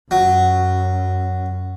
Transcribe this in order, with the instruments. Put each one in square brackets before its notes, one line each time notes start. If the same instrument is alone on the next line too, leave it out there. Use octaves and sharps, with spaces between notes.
[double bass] F#2 [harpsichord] F#3